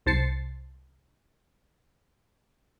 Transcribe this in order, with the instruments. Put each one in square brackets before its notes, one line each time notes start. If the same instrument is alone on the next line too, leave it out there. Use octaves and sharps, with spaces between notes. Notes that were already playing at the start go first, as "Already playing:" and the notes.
[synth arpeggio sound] C2 C5 A5 A6 C7 C#7